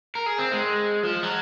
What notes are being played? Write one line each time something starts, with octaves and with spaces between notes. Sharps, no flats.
A#4
G#4
C4
G#3
F3
F#3